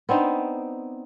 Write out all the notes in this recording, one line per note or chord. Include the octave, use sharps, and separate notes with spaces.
B3 C4 D4 D#4